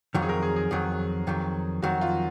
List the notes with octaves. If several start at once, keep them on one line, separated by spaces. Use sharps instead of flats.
F2 D#3 F#3
G#4
A#4
G#4
G#4
F2 D#3 F#3 G#4
F2 D#3 F#3
F2 D#3 F#3 F#4
F4